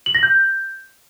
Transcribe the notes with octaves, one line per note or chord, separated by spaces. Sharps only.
F#7
A#6
G6